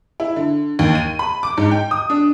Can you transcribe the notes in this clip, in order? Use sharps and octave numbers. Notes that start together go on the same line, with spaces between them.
E4
D3
D#2
D#7
B5
D6
G#2
G5
D#6
D4